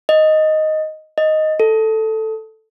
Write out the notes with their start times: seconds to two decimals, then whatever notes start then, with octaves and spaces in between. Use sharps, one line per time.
0.09 D#5
1.18 D#5
1.60 A4